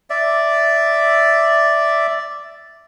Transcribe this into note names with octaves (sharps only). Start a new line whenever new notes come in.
D5 E5